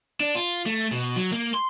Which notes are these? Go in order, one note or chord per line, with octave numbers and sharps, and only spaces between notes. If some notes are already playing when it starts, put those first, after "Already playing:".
D4
F4
A3
B2
F#3
A#3
C6